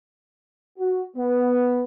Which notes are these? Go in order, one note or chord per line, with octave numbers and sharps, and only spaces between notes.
F#4
B3